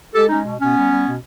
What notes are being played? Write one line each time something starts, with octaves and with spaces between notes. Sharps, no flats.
G#3 G4 A4
G#3 C#4 D#4
B2
B2 B3 C#4
G3
G3
B2